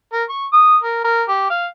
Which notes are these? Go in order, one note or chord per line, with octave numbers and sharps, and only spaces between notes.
A#4
C#6
D#6
A#4
A#4
G4
F5